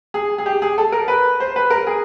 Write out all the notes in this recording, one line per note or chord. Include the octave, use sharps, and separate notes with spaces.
G#4
G#4
G4
G#4
A4
A#4
B4
C5
B4
A#4
G#4